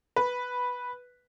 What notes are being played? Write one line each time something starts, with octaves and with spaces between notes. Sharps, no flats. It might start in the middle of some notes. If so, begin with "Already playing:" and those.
B4